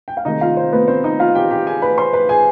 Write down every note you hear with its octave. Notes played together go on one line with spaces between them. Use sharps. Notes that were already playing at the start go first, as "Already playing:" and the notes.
G5
F5
C3 D#3 G#3 D#4 D#5
F4 F5
C4 C5
B3 B4
C4 C5
D#4 D#5
F4 F5
G4 G5
G4 G5
G#4 G#5
B4 B5
C5 C6
B4 B5
G#4 G#5